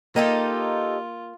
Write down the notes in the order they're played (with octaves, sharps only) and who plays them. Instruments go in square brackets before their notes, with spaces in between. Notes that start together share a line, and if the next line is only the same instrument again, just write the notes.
[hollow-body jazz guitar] A#3 [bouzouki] D#4 G4 A4 [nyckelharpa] F4